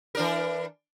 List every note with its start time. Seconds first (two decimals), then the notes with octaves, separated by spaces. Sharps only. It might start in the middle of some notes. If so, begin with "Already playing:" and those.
0.15 E3 D4 A#4